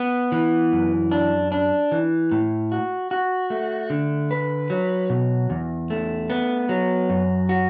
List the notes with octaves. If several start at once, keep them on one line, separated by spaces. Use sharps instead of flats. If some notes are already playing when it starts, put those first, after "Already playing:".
Already playing: B3
E3
F#2
D4
D4
E3
A2
F#4
F#4
A3
D3
B4
F#3
B2
E2
A3
B3
F#3
F#2
F#4